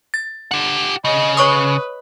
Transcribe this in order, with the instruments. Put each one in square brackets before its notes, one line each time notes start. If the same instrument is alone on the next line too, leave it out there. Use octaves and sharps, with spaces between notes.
[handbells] A6
[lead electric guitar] G4 F#5
[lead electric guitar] C#3 [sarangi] D#5
[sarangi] B4 [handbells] C#5 C#6 D#6